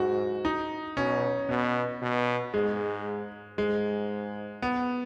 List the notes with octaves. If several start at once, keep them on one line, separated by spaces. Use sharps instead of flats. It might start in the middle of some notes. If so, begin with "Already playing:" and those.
Already playing: G#2 F#4
D#4
B2 C#4
B2 B3
B2
G#2 G#3
G#2 G#3
B3